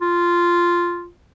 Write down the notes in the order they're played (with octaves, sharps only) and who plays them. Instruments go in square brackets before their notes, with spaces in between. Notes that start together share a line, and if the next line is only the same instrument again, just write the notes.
[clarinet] F4